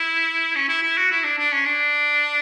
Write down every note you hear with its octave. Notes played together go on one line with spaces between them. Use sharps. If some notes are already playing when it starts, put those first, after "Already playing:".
Already playing: E4
C#4
E4
E4
F#4
E4
D4
D4
C#4
D4